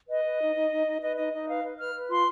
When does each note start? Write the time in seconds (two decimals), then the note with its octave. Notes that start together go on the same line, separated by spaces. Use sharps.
0.08 B4 D#5
0.24 B4
0.39 D#4
0.55 D#4
0.71 D#4
0.86 D#4
1.01 B4 D#5
1.16 D#4 D#5
1.32 D#4 D#5
1.48 B4 F5
1.63 B4
1.79 B4 F6
1.94 B4
2.09 F4 C6